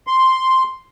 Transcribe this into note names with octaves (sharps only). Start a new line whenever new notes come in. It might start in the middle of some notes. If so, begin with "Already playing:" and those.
C6